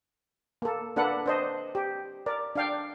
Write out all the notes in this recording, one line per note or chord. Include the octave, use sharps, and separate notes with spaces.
A#3 A4
A#3 D4 A4 B4 F#5
D4 C5 D#5
G4
A#4 D5
D4 F5 G5